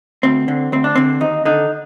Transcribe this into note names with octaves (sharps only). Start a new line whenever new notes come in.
D2 C4
D3
D2 C4
D4
D3 C4
D#2 D#4
D3 D#4